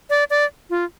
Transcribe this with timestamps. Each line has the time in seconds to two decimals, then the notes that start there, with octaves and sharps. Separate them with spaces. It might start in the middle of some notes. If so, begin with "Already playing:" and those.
0.10 D5
0.30 D5
0.70 F4